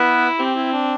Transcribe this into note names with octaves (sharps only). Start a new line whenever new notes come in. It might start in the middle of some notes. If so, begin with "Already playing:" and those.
Already playing: B3 E4 B4
C4 G4
E4
D4